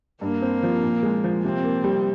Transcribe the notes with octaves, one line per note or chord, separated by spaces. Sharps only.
G2 A#3
C4
F3
A#2
G#3
F3
C3 C4
A#3
G3